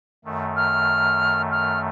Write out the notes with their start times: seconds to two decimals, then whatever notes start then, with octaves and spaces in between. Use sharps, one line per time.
0.25 F#2 D#3 A3
0.56 F6
1.51 F6